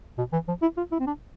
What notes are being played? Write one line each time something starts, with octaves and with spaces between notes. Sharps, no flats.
B2
E3
F3
E4
F4
E4
C4
D4